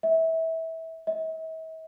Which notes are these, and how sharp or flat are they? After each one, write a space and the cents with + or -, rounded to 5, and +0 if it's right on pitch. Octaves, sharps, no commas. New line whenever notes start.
E5 -25
E5 -45